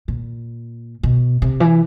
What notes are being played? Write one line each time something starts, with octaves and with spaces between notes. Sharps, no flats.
A#2
B2
C3
E3